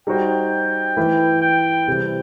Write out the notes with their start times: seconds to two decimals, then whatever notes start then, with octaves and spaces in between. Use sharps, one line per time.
0.07 G3 D#4 F#4 C5 G5
0.97 E3 A3 E4 B4
1.42 G5
1.88 C3 E3 G3 C4